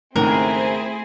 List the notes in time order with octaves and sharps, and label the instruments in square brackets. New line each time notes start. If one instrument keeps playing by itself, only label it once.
[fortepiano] C#2 G#2 D#3 [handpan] A3 [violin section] C4 E4 G#4 [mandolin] A#4